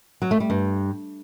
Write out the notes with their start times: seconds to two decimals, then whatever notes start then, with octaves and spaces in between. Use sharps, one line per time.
0.22 F#3
0.31 A3
0.40 G3
0.50 G2